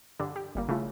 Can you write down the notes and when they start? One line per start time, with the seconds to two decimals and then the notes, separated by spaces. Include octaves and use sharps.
0.19 G2 D3 D4
0.36 G4
0.55 G1 G3 A#3
0.69 C#3 A3 E4 F4